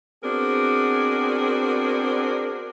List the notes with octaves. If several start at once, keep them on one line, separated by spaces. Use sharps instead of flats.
B3 C4 D4 F#4 G#4 A#4